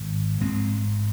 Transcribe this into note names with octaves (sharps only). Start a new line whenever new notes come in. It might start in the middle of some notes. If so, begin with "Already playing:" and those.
Already playing: G#1 G#2
A1 G#2 G#3 C4